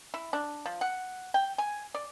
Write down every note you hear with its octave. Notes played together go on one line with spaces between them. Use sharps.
E4
D4
F3
F#5
G5
G#5
D5